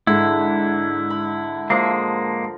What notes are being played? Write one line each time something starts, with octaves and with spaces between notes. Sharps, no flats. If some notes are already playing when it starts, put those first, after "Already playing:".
G#2 D3 E4
B5
F3 G#3 A#3